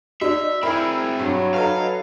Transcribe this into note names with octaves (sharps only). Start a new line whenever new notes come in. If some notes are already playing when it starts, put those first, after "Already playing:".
D#4 F#4 D5 E5
C4 E4 G#4 A#4 B5
G2 F#3
D#4 A4 B4 F5 A#5